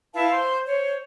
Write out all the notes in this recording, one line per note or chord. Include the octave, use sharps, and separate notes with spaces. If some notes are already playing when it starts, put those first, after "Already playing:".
E4 B4 F5 A5
C5 C6
C5 C#5